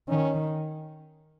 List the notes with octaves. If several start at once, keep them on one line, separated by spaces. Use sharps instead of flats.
D#3 C#4